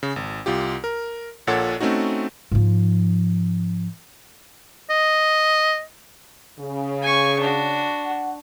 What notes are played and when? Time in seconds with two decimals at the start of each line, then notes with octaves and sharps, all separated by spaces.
0.03 C#3
0.16 G#1
0.46 C2 F4 G4
0.84 A#4
1.47 A#1 A#2 A4 C#5 F#5 A6
1.80 A3 C4 C#4 D#4 F#4
2.52 G#2 F3
4.90 D#5
6.59 C#3
7.02 G#5 C#6
7.40 D4 F#4
8.05 F#5